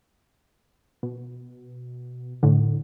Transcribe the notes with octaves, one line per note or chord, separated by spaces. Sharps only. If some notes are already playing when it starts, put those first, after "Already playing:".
B2
A2 D3